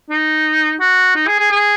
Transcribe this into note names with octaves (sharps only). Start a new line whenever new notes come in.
D#4
F#4
D#4
G#4
G#4
G#4